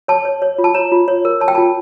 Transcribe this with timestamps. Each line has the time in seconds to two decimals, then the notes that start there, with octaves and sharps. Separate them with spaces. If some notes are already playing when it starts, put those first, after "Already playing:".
0.08 C#5 A5
0.25 C#5
0.42 C#5
0.58 F4
0.64 A5
0.74 C#5 A#5
0.92 F4
1.08 C#5
1.25 A#4
1.40 C#5 A5
1.48 G5
1.55 F4 A5